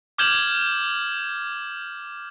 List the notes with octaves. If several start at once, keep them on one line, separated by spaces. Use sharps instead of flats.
D6 F6 G6 G#6 E7 F#7